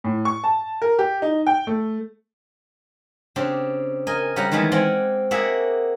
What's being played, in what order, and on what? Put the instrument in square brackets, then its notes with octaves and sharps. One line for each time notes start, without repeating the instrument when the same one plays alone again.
[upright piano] A2
C#6
A5
A#4
G4
D#4
G5
A3
[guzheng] C#3 C4 D4 G4
A#4 D#5 G#5
C#3 G3 G4 F#5 A#5
D#3 E3 G#3 A3 B3
G#3 C4 D5 F5 F#5 G#5
A#3 F#4 G#4 D5 E5 F#5